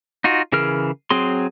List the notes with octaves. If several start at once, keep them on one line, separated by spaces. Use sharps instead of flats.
D#4 F4 F#4
C#3 E3 G#4 A#4 F6
F#3 C4 G#4 C6